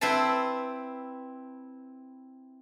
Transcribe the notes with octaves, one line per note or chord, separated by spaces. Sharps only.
C4 E4 B4 C5 A5